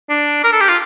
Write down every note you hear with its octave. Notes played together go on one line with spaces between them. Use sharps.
D4
A#4
A4
G4
F4